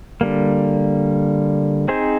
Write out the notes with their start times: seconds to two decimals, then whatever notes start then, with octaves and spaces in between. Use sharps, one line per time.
0.21 D3 G3 A#3
1.88 C4 D#4 G#4 C5